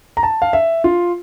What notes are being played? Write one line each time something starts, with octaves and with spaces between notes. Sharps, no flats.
A#5
A5
F5
E5
F4